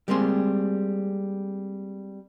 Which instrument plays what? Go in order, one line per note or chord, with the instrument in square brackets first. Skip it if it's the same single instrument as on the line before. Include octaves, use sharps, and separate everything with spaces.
[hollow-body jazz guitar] G3 G#3 A#3 C4 G#4 C6